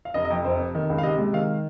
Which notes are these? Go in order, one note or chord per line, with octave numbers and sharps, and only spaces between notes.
F5
F1 D#5
D#5
F2
F1 C5
F1
D#3
C#2
F5
C3 D#5
G#3
D#3 F5